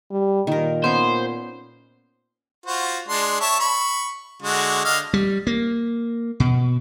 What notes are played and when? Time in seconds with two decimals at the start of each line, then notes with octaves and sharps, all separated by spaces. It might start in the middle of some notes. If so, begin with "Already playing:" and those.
0.11 G3
0.47 A#2 D#3 A#4
0.84 B3 C#4 C5
2.66 F4 F#4 C5
3.08 G#3 D4 C6
3.41 C#5 E5 A5
3.60 B5 C#6
4.42 D3 G#3 F#4
4.85 D3 D#5 F5
5.14 G3
5.47 A#3
6.40 B2